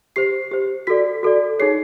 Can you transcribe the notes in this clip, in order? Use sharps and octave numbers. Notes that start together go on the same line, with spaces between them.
G4 C5 C7
G4 C5
F#4 A4 D5 B6
F#4 A4 D5
D#4 G#4 C#5 C7